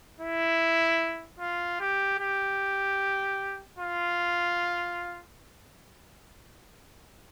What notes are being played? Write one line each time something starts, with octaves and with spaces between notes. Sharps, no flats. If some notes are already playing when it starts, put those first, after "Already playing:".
E4
F4
G4
G4
F4